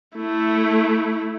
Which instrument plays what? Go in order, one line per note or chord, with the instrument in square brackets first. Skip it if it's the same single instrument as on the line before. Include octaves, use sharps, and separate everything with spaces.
[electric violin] A3 E4